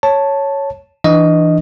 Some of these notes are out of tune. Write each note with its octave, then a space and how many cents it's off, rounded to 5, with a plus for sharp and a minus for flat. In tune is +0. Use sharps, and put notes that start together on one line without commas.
C#5 +0 A5 +0
E3 +0 D4 +20 D#5 +0